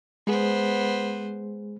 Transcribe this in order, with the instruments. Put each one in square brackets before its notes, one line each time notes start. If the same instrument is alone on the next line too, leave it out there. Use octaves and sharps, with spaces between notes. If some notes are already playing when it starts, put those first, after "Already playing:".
[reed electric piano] G#3 G#4 [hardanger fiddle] B3 C5